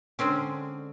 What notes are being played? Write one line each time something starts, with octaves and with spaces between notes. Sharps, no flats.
D3 G#3 C4 C#4